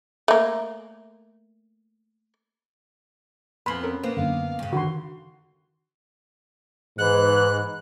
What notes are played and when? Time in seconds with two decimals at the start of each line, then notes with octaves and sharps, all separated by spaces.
0.28 A3 A#3
3.66 F2 B3 G#5 B5 C6 F6
3.83 C#4 A4 A#4
4.03 A#3 B3 C5
4.17 F#2 D3 F5
4.59 G2 C#3
4.73 D3 D#3 F#4 C6
6.98 G#2 E3 F#6